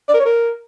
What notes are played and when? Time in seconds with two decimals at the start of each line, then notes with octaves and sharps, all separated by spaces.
0.08 D5
0.14 A#4
0.20 C#5
0.25 A#4